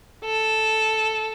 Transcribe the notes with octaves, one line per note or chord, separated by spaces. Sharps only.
A4